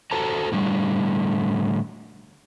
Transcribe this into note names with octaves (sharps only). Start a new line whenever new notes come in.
F#4 A4 C5 A5 A#5
A2 D3 G3